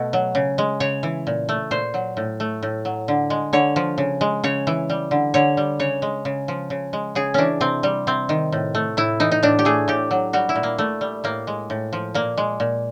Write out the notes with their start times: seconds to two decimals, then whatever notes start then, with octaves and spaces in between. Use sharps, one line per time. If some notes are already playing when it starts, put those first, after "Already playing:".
Already playing: B2 A3
0.13 F#3
0.35 C#3
0.58 G#3
0.80 C#3 C#5
1.03 E3
1.27 A#2
1.49 A3
1.71 A#2 C5
1.94 F#3
2.17 A2
2.40 A3
2.63 A2
2.85 F#3
3.08 D3
3.30 G#3
3.53 D3 C#5
3.76 F3
3.98 C#3
4.21 G#3
4.44 C#3 C#5
4.67 E3
4.90 G3
5.11 D3
5.34 D3 C#5
5.57 G3
5.80 C#3 C#5
6.02 G#3
6.25 C#3
6.48 F3
6.70 C#3
6.93 G#3
7.15 C#3 G#4
7.34 E3 C#4 D4
7.61 C3 C4
7.83 G3
8.07 C3 C4
8.29 D#3
8.52 A2
8.75 A3
8.97 A2 E4
9.20 E3 D#4
9.32 D#4
9.43 A2 D4
9.59 G4
9.65 A3 G#4
9.88 A2 G4
10.11 F#3
10.33 G3 F#4
10.49 E4
10.56 A#2
10.63 A#3
10.78 A#2 A3
11.01 G3
11.24 A2 A#3
11.47 G#3
11.70 A2
11.93 F3
12.14 A#2 A#3
12.38 G#3
12.60 A#2